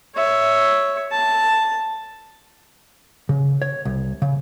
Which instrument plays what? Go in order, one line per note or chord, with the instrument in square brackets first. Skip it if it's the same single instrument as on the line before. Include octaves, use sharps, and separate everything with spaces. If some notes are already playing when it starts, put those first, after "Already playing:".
[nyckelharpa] C#5 E5
A5
[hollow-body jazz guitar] C#3
C#5
C2
C#3